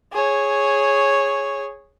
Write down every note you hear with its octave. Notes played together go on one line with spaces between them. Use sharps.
G#4 C#5